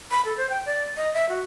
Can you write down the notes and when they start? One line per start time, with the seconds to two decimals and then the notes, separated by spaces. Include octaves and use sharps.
0.11 B5
0.25 A4
0.37 C5
0.50 G5
0.66 D5
0.97 D#5
1.14 E5
1.29 F#4